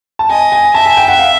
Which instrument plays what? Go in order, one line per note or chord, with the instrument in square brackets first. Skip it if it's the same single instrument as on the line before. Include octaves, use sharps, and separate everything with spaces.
[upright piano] A5
[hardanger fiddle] D#5 [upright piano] G#5
[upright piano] G#5
[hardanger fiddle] E5 [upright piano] A5
[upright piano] G#5
G5
F#5
F5